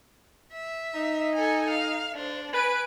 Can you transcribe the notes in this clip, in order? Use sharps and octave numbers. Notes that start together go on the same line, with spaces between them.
E5
D#4
A4 G#5
F5
D4 C5
B4 G#5 D7